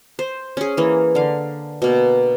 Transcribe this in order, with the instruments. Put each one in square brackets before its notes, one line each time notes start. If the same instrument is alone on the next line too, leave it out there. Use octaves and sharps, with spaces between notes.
[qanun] C5
C#4 G#4
E3 A#3
D3 F5
B2 A#3